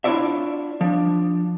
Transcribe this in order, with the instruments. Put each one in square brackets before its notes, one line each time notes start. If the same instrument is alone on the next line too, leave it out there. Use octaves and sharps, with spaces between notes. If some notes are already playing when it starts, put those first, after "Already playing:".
[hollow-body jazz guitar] D4 E4 F4 C#5 D5 E5
F3 D4